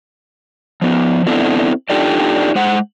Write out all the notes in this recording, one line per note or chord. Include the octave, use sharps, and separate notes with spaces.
F3 B3
B3 C4 D4 E4 A4
D4 D#4 F4 G4 A4 D5
G#3 C5 F#5